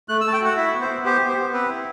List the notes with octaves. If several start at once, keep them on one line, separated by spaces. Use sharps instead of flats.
A3 F#6
E6
A3 A5
G5
F#4 F#5
E4 E5
B3
C5
B3
G4 C5
B3
C5
B3
C4 B4
E4